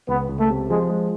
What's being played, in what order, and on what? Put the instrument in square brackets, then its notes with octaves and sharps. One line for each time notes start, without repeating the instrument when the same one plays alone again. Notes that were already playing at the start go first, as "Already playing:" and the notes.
[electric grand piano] C#2 [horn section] B3
[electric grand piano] C#2
[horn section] A3
[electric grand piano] C3
[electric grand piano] F3 [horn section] G#3
[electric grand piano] G#3